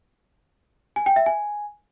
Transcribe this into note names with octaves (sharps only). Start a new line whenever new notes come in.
G#5
G5
E5
G#5